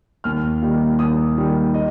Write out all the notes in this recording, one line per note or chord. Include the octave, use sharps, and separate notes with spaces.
D#2 F6
D#3 G3 A#3
D#2 D#6
D#3 G3 A#3
D#5